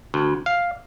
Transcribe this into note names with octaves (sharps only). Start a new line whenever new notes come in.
D2
F5